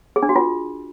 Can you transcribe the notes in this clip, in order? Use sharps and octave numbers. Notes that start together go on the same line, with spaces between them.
G#4
D4
F#4
F4